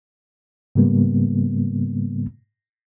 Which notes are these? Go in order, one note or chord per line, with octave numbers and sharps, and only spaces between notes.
G#2 C#3 G3 A#3 B3